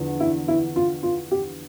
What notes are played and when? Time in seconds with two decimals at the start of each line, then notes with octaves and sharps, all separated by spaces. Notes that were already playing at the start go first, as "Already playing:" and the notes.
Already playing: E2 D3 F3
0.20 E4
0.48 E4
0.76 F4
1.03 F4
1.31 G4